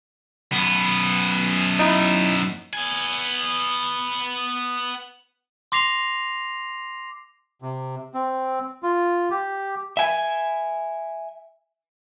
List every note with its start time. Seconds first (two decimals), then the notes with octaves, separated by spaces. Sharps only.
0.52 F#2 B3
1.79 D#4 E4
2.73 B3 G#5
5.72 C6 D6 A#6 C7 F7
7.62 C3
8.14 C4
8.83 F4
9.30 G4
9.97 E5 G#5